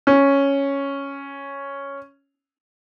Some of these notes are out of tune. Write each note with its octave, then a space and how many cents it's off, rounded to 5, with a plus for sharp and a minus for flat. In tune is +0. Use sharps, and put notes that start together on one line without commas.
C#4 +0